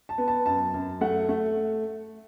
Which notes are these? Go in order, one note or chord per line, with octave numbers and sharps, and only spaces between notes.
A5
B3
A5
F#2 A5
F#2
A3 F#5
A3